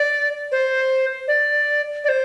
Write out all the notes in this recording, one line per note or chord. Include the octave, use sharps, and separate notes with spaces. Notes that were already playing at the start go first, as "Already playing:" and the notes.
Already playing: D5
C5
D5
D5
C5